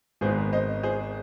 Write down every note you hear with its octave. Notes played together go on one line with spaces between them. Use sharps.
G#1 G#2 D#3 B3 G#4 C5
C5 D#5
G#4 C5